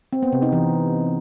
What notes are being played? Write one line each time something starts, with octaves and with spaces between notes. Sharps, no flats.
C4
B3
C3
D#4
E3